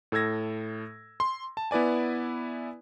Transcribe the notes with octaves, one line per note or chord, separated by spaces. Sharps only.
A2 A4 E6 G#6 A#6
C6
A5
B3 E4 B4 D5 G#5